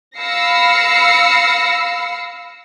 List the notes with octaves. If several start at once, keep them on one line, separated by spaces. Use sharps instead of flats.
F5 B5 E6 A#6 C7 C#7